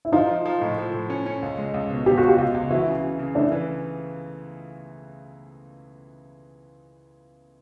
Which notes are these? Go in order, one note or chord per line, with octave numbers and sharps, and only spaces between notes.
E4
F3 D#4 F4
F3
F3
A2
F3
A2
C#4
C#4
C#2
G#3
C#2
B2
B2 G4
F#4
C#2
F4 G4
C#2
C#2
E3 E4 F#4
C#3
C#3
C#3
A3 D4 E4
E3